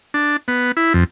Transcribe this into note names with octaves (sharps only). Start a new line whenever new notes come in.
D4
B3
E4
F2